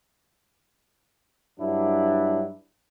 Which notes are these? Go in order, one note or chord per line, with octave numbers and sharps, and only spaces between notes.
G2 F#3 D4 E4